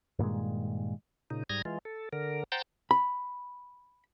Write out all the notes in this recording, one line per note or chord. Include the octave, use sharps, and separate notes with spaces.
G2 A#2 D#3 G#3
A#2 C#3 D#4
G#2 G3 A#5 D#6 G#6 A#6
E3 G#3 F4
A4
D3 A#4
C5 F#5 G5 A#5 G6 A6
B5